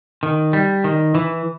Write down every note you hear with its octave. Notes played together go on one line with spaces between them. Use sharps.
D#3
G3
D#3
E3